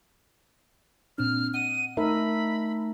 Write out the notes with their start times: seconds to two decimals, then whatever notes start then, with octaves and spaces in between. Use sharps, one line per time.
1.18 A#2 C4 D4 F6
1.54 D#5 F#5 D#7
1.97 A3 D#4 A#4 E5 B5